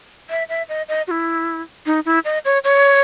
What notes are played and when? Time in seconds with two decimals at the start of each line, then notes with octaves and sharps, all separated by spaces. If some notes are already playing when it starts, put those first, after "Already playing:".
0.30 E5
0.49 E5
0.69 D#5
0.89 D#5
1.07 F#4
1.11 E4
1.86 D#4
2.06 E4
2.25 D#5
2.45 C#5
2.64 C#5